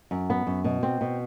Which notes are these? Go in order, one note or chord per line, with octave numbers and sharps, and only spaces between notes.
F#2
B3
F#2
B2
C4
B2